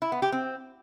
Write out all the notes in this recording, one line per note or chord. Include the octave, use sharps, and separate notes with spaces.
E4
B3
G4
C4